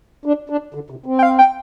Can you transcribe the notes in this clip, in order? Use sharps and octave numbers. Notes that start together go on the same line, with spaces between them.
D4
D4
D3
C3
C4
G5
F5
G5